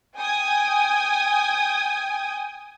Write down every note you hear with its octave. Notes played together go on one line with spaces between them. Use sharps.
G5 G#5 D#6 G#6